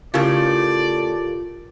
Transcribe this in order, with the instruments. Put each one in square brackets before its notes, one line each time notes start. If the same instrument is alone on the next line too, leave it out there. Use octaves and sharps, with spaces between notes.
[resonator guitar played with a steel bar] A2 C#3 [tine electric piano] F4 G4 A#4 [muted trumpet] D5